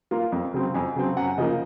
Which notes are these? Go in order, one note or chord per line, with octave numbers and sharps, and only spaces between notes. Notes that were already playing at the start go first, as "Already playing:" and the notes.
A#3 F4
F2
C#3 F#3 C4
F2 G#5
C#3 F#3 C4
F#2 F#5
C#3 F3 A#3 D#5